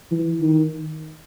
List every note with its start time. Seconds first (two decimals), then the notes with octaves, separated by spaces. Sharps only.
0.11 E3
0.41 D#3